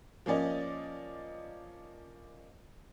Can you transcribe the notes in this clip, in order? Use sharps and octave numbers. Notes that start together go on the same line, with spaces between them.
F3 A#3 C#4 D5 D#5